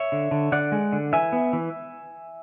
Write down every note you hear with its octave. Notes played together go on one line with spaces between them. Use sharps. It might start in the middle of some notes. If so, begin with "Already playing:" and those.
Already playing: C#5 E5
D3
D3
D3 D5 F#5
G#3
D3
E3 E5 G#5
B3
E3